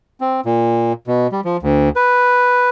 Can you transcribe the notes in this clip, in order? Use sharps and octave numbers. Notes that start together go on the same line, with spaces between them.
C4
A#2
B2
G3
F3
D2
B4